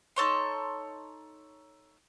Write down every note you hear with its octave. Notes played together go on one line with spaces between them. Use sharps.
D#4 A4 C#5 C6